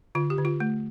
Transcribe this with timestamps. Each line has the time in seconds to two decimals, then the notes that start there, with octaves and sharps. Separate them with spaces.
0.15 D3 F4
0.30 G4
0.38 D3
0.45 F4
0.60 A3